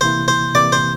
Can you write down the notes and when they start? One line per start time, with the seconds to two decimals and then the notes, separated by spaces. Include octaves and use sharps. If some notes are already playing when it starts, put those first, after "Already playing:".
0.01 C3 E3 A#3 E4 C5
0.28 C5
0.55 C3 E3 A#3 E4 D5
0.72 C5